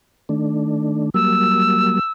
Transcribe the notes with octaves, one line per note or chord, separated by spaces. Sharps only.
D#3 A3 D4
F#3 G3 A#3 E6